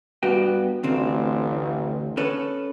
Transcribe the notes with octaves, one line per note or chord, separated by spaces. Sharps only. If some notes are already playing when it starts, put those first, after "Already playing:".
G2 B3 F#4 G4
A1 D2 C4
C#4 A4 B4